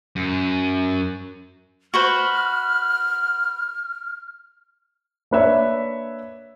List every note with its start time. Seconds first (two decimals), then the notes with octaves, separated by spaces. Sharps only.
0.16 F#2
1.94 F#4 B4 C5 F6
5.31 A#3 D4 B4 C#5 E5